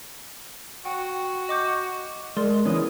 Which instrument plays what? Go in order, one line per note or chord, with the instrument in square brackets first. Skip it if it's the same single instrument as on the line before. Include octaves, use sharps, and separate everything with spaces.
[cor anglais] F#4 [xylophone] G5
[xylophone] D#5 D6 G6
[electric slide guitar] G#3 [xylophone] A#4 D5 C6
[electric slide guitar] E3 B3 C#4 [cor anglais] D#5